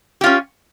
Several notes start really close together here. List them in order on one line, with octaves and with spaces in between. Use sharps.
G4 F4 C#4